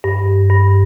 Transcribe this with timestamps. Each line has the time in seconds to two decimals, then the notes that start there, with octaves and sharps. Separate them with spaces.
0.04 G2
0.50 G2